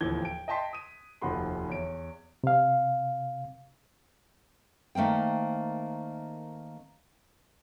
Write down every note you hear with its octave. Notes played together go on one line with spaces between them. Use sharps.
D1 D#2 E3 F3 G#6 G7
G5 D7
D#5 G5 A5 C6 B6
D#6 D#7
F1 D#2 F3 F#4 B5 C6
E2 C#5 D7
C3 F5
D#3 A3 A#3 C4 G5